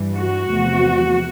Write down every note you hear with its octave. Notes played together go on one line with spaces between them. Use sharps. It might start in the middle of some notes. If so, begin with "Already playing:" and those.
Already playing: G2 E3 G3
F#4
E2 C3 F3 A3